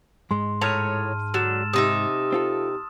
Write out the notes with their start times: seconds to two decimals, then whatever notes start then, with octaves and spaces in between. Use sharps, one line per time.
0.31 G#2 G#3 C6
0.61 A2 C#5 A5 A#5 F6 D#7
1.34 D3 F#3 E6 A6 E7
1.73 C3 D#4 E5 C6 D#6
2.32 C4 F4 A4